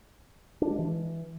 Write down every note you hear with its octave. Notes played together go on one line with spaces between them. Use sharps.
D4
G#3
E3